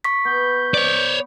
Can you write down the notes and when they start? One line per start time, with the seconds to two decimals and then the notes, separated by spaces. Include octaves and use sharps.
0.04 C#6 B6
0.25 B3 G6
0.74 C#5 D5